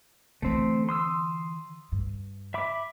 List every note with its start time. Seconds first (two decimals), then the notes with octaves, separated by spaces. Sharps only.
0.42 D3 E3 A3 C4
0.89 C6 D#6 E6
1.92 G2
2.54 E5 B5 D6